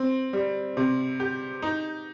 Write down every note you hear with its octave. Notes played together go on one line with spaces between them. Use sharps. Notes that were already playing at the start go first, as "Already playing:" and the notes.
Already playing: C4
G3
C3
G4
D#4